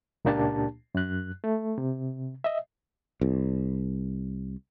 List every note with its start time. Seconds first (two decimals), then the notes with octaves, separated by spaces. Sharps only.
0.25 C#2 A#2 A#3 D4 G4 A5
0.95 F#2 F#6
1.44 A3
1.78 C3
2.44 D#5 E5
3.21 C2